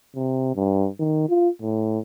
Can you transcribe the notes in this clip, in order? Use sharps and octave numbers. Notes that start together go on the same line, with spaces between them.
C3
G2
D#3
F4
A2